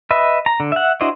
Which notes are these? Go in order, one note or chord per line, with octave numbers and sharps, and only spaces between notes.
B4 D#5 E5
A#5
D3
E5 F#5
D4 E4 F#4 C5 D#5